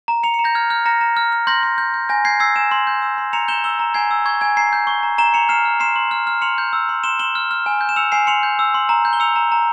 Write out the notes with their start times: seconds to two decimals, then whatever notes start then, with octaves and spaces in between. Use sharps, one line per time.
0.08 A#5
0.23 A#5 C#7 F7
0.34 C#7 F7
0.39 A#5
0.44 G6 A#6
0.55 F6 G#6
0.70 F6 G6
0.86 A#5 A#6 C#7
1.01 A#5
1.17 F6
1.32 F6
1.47 C6 G6 A#6
1.63 C6
1.78 G6
1.94 G6
2.09 G#5 G6 A#6
2.25 G6 G#6 C7
2.40 E6 G#6 C7
2.56 G#5 C7 E7
2.71 C6
2.87 G6
3.02 E6
3.18 C6
3.33 A#5 C#7 F7
3.48 G6 E7 G7
3.64 E6 E7 G7
3.79 A#5
3.94 G#5 G#6 C7
4.11 E6
4.26 C#6 G#6
4.41 G#5 G#6
4.57 A#5 G#6 C7
4.73 G6
4.87 C#6
5.03 A#5
5.18 A#5 E7 G7
5.34 A#5 C#7 F7
5.49 F6 C7 E7
5.65 F6
5.80 C6 C7 E7
5.96 C6
6.11 F6
6.27 F6
6.42 C6 C#7 F7
6.58 G6
6.73 E6
6.89 C6
7.04 C6 E7 G7
7.19 C6 E7 G7
7.35 F6
7.51 F6
7.66 G#5
7.81 G6
7.89 E7
7.96 E6 C#7 F7
8.12 G#5 C7 E7
8.27 C6 C#7 F7
8.43 G6
8.59 E6
8.74 C6
8.89 A#5
9.05 G6
9.13 G7
9.20 E6 C#7 F7
9.36 A#5
9.52 A#5